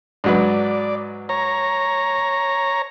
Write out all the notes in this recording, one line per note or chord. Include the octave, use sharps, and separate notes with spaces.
G#2 F#3 B4 D5
C#5 A#5